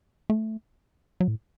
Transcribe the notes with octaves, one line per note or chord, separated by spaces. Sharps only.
A3
F#3
A2